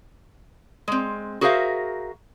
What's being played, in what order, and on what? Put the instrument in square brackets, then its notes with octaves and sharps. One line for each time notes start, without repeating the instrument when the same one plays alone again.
[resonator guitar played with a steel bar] G#3 C4
F#4 G#4 A#4 C5 E5 F5